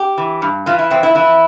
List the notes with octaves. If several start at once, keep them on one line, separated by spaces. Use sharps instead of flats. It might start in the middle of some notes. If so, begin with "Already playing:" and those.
Already playing: G4
E3
G2
E3 F4
E4
F2 C4
E4
E3 E4